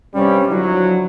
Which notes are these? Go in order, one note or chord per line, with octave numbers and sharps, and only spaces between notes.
G2 C3 G3 C#4
D3 F3 F#3 E4